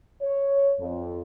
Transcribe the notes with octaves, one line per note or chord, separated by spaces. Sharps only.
C#5
F2